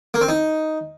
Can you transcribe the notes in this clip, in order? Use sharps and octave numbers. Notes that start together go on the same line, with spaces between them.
A#3
C4
D#4